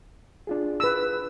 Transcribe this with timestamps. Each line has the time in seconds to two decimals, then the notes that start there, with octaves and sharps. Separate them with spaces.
0.47 D4 F4 G#4
0.80 B4 E6